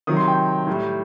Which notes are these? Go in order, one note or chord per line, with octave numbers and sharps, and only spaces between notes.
C3 D#3 F#3 D#6
C6
G5
A2 G3